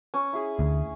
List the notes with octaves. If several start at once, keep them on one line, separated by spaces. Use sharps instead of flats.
C#4
E4 G#4
D2